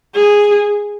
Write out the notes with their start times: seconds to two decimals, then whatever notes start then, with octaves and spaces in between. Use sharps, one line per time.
0.15 G#4